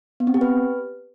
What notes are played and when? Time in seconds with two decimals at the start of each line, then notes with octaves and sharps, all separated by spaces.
0.20 B3
0.27 C4
0.34 G4
0.41 B4